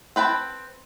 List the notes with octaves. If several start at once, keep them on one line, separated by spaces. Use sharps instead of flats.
C4 B4 G5 A5